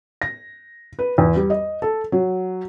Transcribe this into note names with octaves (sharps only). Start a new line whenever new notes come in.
A#6
B4
E2
G3
D#5
A4
F#3